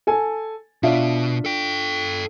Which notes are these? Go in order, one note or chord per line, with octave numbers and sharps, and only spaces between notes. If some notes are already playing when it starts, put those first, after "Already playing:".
A4 G#5
B2 D4 F4 E5
A4 G5